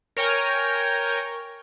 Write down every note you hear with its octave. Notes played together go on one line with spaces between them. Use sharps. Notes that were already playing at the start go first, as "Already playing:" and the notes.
A#4 C#5 G5 G#5 A#5